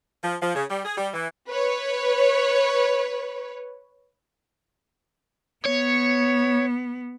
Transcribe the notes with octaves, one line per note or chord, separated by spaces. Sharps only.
F3
F3
C#3
G3
G#4
G3
E3
B4 C#5
B3 C#5